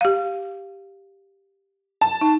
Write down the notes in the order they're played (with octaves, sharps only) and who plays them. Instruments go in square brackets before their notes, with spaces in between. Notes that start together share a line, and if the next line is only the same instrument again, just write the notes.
[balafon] G4 F5
[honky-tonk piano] A5
[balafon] D#4